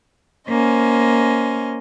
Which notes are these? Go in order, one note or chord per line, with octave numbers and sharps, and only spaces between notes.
A#3 C#4 C5 D#5